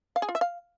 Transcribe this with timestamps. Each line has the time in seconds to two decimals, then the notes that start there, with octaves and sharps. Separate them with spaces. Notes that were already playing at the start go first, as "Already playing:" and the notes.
0.16 F5
0.22 G#4
0.29 F4
0.35 E5
0.41 F5